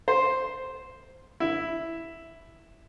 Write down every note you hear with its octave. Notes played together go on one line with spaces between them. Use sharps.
C5
E4